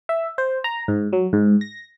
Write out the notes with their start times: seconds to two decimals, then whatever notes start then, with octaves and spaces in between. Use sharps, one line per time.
0.09 E5
0.38 C5
0.64 A#5
0.88 G#2
1.13 F#3
1.33 G#2
1.61 A#6